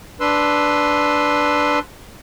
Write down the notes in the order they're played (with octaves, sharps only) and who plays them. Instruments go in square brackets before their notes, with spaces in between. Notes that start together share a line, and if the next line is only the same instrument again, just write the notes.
[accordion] D4 B4 C6 E6